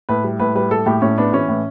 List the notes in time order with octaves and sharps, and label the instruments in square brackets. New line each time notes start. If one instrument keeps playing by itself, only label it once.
[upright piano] A2 B4
G3
A2 B4
G3 B4
A2 A4
A2 G4
A2 C#4
B3 D4
E3 C#4
A2